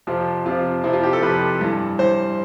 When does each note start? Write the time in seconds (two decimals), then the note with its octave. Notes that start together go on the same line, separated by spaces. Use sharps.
0.07 F2 C3 F3 F4
0.45 F2 C3 F3 F4
0.84 F2 C3 F3 E4
0.93 F4
1.03 G4
1.13 A4
1.22 F2 C3 F3 B4
1.61 G2 E3
1.99 G2 E3 C5